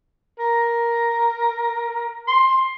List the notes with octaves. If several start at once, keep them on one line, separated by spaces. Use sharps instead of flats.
A#4
C6